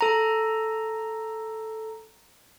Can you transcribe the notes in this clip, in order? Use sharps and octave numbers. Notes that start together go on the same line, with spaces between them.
A4 A#5